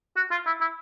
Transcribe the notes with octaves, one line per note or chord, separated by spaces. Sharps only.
F#4
F4
E4
E4